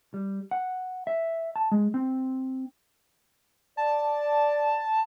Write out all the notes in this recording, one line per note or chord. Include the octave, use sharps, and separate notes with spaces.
G3
F#5
E5
A5
G#3
C4
D5 A5